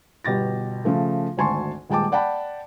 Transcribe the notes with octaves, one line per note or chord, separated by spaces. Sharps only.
G1 B2 G4 A6 A#6
C#3 F3 A3
G#1 D2 G#5 A5 C6 C#6
D#1 G#3 G5 A5 D6
D5 F#5 G5 A5 B5